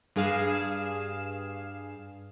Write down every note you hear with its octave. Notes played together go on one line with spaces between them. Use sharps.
G2 G#4 F5 E7